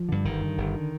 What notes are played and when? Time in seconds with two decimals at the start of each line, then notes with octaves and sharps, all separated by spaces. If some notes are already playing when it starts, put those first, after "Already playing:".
Already playing: F3
0.09 G2 D3
0.25 G1 D#3
0.41 G2 D3
0.58 G1
0.75 D3